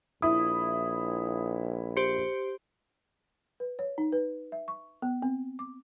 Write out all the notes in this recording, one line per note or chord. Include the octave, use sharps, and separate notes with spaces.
A#1 E4 D#6
G4 C5 C6 C#7
B4
C#5
D#4
B4
E5
C#6
B3
C4
D6